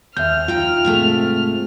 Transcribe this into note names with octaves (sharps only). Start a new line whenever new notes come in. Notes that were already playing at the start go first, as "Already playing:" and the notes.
D#2 E5 F6 G6
D#4 F4 G5
G#2 C3 A3